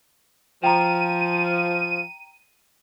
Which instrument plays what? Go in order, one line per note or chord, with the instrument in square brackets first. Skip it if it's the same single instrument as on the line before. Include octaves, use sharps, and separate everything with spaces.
[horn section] F3 [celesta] G5 A#5 [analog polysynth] D#7